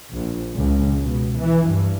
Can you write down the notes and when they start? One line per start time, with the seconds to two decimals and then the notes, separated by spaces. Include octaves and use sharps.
0.11 A#1
0.55 C#2
1.02 B2
1.37 E3
1.67 G2